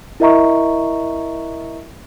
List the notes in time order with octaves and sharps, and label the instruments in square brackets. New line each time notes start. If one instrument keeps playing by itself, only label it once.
[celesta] E4 A#4 D#5 E5 A#5 C#6